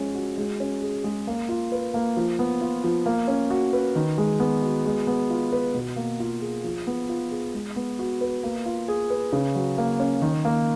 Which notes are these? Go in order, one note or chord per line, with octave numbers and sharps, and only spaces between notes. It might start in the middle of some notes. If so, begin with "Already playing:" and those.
Already playing: F3 G#3 C#4
F#4
G#3
C#4
G#4
G#3
A#3
F4
B4
A#3
F3
B3
F4
F3
A#3
C#4
F#4
B4
D#3
G#3
B3
F#4
G#3
B3
F4
B4
B2
A#3
F4
G#4
F3
B3
F4
G#4
G#3
B3
F#4
B4
A#3
F4
G#4
B4
C#3
F#3
A#3
C#4
D#3
A#3